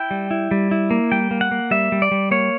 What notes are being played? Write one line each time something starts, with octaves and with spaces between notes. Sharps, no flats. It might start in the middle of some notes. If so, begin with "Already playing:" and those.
Already playing: E4 G5
G3
E4
G3
E4
A#3
G3 G5
A#3
F#5
A#3
G3 E5
G3
D5
G3
A#3 C#5